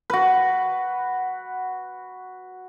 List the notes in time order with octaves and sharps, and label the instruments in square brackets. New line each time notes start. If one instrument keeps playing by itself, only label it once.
[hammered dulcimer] F#4 B4